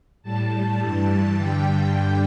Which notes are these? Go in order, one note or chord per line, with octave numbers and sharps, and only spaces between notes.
A2 G3 A5
G2 E3 G3
G2 D3 G3 G5